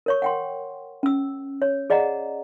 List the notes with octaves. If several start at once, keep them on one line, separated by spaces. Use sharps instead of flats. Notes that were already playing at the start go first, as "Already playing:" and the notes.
A#4 C#5 C#6
F#5 G5 C6
C#4 E6
C#5
G#4 D5 D#5 F#5 A#5